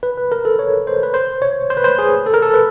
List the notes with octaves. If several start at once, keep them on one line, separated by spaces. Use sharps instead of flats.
B4
B4
A#4
A4
C#5
C5
B4
C5
C#5
C5
B4
C5
G#4
A4
A#4
A4
B4